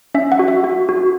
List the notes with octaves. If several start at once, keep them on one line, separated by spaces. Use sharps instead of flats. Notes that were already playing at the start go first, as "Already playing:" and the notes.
C#4 E5
F#5
F#4
E5
F#4
F#4